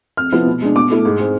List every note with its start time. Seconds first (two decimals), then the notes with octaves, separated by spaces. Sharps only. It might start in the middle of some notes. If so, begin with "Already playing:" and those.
0.17 F2 F6
0.32 C3 F3 B3 E4
0.46 B2
0.62 G#3 D4
0.76 B2 D6
0.90 A3 E4
1.05 G#2
1.20 G#3 C4